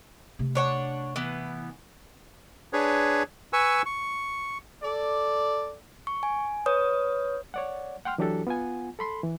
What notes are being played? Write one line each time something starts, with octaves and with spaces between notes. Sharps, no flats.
C3 A3
D4 C#5 F#5
E3 B3
D4 G#4 B4 C#5
B4 G#5 C#6 E6
C#6
A4 D5
C#6
G#5
B4 C#5 D#6
C#5 D5 F#5
F#5 G5 C6 F6
E3 F#3 D4 F#4 G4 A4
B3 F4 F#5 G#5
A4 B5 C6
E3